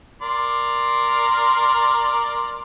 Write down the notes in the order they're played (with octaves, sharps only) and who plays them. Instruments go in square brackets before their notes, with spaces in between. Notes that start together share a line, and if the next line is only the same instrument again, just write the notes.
[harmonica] A#4 D5 C6